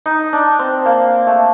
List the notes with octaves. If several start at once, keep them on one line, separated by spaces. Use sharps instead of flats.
D#4
D4
C4
A#3
A3